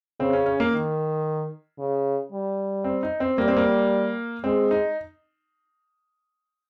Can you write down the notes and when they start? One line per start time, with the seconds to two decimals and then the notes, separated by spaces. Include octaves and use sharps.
0.20 C#3 C4
0.33 C#4
0.46 C#4
0.60 A#3
0.73 D#3
1.79 C#3
2.32 G3
2.84 C4
3.03 D#4
3.20 C4
3.38 G3 A#3
3.48 C4
3.57 A#3
4.44 G#3 C4
4.71 D#4